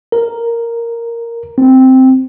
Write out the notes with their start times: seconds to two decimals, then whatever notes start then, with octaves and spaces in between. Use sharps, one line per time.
0.12 A#4
1.58 C4